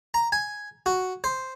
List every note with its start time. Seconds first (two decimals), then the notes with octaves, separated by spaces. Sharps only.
0.14 A#5
0.32 G#5
0.86 F#4
1.24 C5